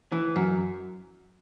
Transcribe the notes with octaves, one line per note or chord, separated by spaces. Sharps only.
E3
F#2